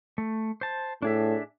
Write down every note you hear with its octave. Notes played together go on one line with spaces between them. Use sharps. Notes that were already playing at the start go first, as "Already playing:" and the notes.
A3
C5 A5
A2 D4 G#4 E5